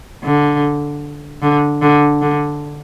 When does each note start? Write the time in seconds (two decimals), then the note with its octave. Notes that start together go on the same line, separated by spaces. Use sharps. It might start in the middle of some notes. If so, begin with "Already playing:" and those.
0.23 D3
1.42 D3
1.82 D3
2.22 D3